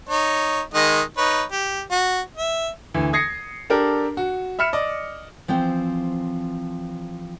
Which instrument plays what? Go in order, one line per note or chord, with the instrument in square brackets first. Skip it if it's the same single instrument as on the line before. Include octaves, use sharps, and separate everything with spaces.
[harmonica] D#4 C#5
D#3 G#3 D#5
D#4 B4 C#5
G4
F#4
E5
[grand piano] D2 E3
D#6 G#6 A#6 C7 C#7
D4 G4 A4 A#4
F#4
E5 B5 F6 C#7 E7
D5 D#5
[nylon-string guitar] E3 F3 C4 G5